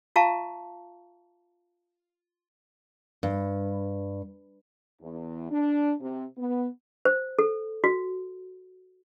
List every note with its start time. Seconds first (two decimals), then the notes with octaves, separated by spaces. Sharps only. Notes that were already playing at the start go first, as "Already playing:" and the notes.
0.16 F4 E5 F5 A5 A#5 C#6
3.23 G2
5.01 E2
5.50 D4
6.00 C3
6.37 B3
7.05 C5
7.39 A4
7.84 F#4